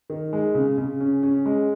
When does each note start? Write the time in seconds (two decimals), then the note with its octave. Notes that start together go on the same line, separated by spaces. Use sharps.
0.10 D#3
0.33 G#3
0.55 C#3
0.78 C#3
1.00 C#4
1.23 C#4
1.46 G#3